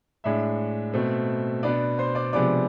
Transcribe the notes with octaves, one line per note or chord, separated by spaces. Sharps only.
A2 G#3 D4 E5
B2 A3 C4
B2 B3 D4 D5
C5 C6
D5 D6
C3 F3 G#3 B3 D4 D5 D6